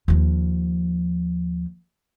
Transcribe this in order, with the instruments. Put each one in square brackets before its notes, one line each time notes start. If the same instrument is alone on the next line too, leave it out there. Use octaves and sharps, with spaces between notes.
[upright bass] D#2 F3